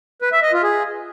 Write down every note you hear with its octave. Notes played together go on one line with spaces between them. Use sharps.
B4
E5
D#5
F4
G#4